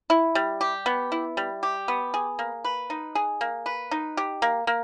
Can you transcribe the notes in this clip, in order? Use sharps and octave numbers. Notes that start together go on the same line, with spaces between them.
E4
G3
G4
B3
E4
G3
G4
B3
G#4
A#3
B4
D#4
G#4
A#3
B4
D#4
G4
A#3
A#3